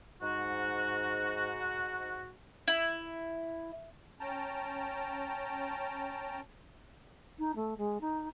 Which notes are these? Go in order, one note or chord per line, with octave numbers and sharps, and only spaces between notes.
G#2 F#4
E4
C#4 G5 A5 A#5
D#4
A3
G#3
D#4